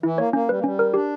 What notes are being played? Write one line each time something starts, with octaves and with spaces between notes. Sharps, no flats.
E3 E4
A#3 C#5
A#3 C#4
G3 B4
A#3
G3 C#4
A#4
D4 G4